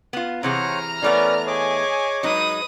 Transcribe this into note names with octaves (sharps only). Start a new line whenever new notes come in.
B3 F4
C3 E3 G#4 C5 C#5 F#5 A#5 F6
E3 A3 B3 C#4 A#4 B4 D5
G#4 C#5 D#5 G#5 D6
F#3 G#3 D#4 B4 D#6